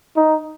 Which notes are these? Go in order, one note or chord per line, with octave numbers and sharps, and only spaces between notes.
D#4